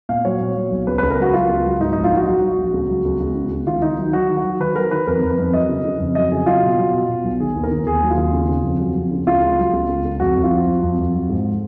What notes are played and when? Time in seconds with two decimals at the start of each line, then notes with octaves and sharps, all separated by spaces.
0.09 A#2 F5
0.25 F#3 C#5
0.41 A#2
0.56 F#3
0.71 B1
0.87 C#2 B4
0.98 C#2 B4
1.10 A#4
1.18 F#3 F#4
1.33 F#3 F4
1.49 C#2
1.65 F#3
1.80 G#2 D#4
1.93 A#1 D#4
2.04 F4
2.11 A#1 F#4
2.26 F#3 F#4
2.42 F#3
2.58 A#1
2.74 C#2
2.89 F#3
3.05 C#2
3.20 C#2
3.35 C#3
3.51 C#2
3.67 D#3 F4
3.82 D#3 D#4
3.98 F#3
4.13 F#3 F#4
4.30 D#3
4.37 F#4
4.44 F#3
4.60 D#3 B4
4.75 F#3 A#4
4.91 D#3 B4
5.07 F2 A#4
5.23 F2
5.30 B4
5.39 F2
5.53 F#3 D#5
5.69 C#3
5.85 C#3
6.00 F2
6.15 F#3 D#5
6.31 C#3 G#4
6.46 F#3 F4
6.63 B2
6.78 F#3
6.93 B2
7.09 B2
7.24 B1
7.40 D#3 G#4
7.55 D#2
7.63 A#4
7.71 D#2
7.86 D#2 G#4
8.02 F#3
8.10 F4
8.17 D#2
8.33 C#3
8.49 C#3
8.64 F2
8.80 F#3
8.96 F2
9.11 C#3
9.27 C#2 F4
9.42 C#2
9.58 F#3
9.73 C#2
9.89 C#2
10.05 C#2
10.20 F2 F#4
10.36 F2
10.43 F4
10.51 F3
10.67 F3
10.82 F2
10.98 F2
11.14 F#3
11.29 G#2